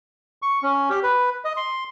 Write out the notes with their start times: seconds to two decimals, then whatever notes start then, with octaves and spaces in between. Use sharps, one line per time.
0.42 C#6
0.63 C#4
0.90 G4
1.03 B4
1.45 D#5
1.57 C6